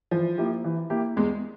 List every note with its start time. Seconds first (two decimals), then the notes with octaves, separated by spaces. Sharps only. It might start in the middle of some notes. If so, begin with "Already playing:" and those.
0.11 E3 F3
0.38 A#3 E4 G4
0.64 E3
0.90 A#3 E4 G4
1.16 E2 G#3